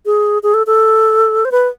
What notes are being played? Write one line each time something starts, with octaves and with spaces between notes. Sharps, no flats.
G#4
G#4
A4
A4
C5
B4